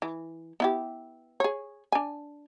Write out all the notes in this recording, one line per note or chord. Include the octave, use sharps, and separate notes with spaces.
E3
B3 E4 G4
G#4 C#5
D4 G#5